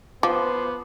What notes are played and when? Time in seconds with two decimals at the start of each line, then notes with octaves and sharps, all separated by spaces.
0.23 F3 B3 C5 D6